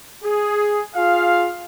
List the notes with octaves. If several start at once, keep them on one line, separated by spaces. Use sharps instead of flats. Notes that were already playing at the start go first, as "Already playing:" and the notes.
G#4
F4 G#4 F5